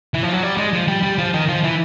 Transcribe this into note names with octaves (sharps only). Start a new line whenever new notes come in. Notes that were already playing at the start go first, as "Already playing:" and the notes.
E3
F3
F#3
G3
G#3
F3
G3
G3
F3
D#3
F3
E3